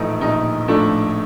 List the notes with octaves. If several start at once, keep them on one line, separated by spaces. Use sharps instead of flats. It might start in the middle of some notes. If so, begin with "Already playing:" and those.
Already playing: A#1 A2 E3 F3 A3 D#4 E4
A#1 D#4
A2 F3 A3 D4